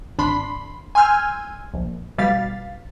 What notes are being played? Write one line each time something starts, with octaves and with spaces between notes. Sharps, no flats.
G#1 D4 B5 C6 C7
G#5 C6 E6 F6 G6 G#6
A#1
A1 B2 G3 F5 A6 B6